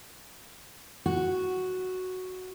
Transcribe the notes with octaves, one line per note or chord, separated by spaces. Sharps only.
F#4